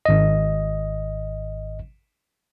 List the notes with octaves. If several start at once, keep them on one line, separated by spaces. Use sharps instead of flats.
G#1 D#5